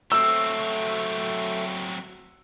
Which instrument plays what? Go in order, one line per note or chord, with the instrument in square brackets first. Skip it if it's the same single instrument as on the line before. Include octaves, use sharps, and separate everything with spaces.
[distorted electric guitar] F#3 C4 [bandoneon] A3 [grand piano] E6